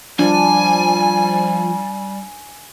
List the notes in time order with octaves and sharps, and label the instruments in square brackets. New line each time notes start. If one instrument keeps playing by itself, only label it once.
[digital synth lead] F3 [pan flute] G3 [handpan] D4 [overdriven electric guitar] G#5